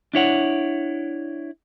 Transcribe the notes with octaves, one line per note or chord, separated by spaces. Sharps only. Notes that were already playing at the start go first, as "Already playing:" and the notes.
D4 E4 C#5 F#5